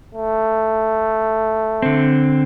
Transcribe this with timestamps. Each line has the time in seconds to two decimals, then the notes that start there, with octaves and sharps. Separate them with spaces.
0.15 A3
1.82 D3 C4